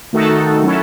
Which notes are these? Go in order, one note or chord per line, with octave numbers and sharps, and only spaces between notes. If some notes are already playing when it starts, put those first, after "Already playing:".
D#3 A3 D#4 F#4 A4
F#3 C#4 E4 A4